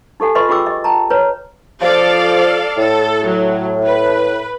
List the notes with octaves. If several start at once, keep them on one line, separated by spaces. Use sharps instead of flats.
D#4 G4 A4 F#5 G#5
F4 B4 D#5 C6 C#6
F4 F#4 G#4 G5 D6 E6
G4 D#5
G5 A5 A#5
B4 C#5 A#5
F3 A4 D5 F5
A2 A4
F#3
B4